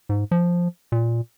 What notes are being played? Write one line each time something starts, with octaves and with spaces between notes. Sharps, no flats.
G#2
F3
A#2